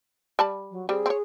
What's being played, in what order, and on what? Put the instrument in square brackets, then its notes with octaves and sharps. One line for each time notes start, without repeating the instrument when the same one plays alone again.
[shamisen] G3 A5 B5
[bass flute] F#3
[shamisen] G3 C4 [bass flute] G#4
[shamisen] C4 C#5